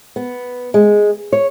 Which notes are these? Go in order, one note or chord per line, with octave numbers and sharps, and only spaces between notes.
B3
G#3
C#5